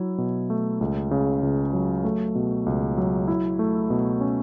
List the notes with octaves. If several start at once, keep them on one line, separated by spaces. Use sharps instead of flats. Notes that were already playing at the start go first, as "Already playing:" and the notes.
Already playing: F#3 E4
B2
A3
C#2
C#3
C#2
F#3
A3
B2
C#2
F#3
E4
A3
B2
C#4